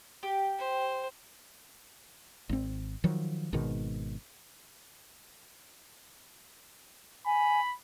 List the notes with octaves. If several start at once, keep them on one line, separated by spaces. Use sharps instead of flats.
G4
C5
G#1 C4
D#3 F3 F#3
G#1 G#2 B2 D#3
G#5 B5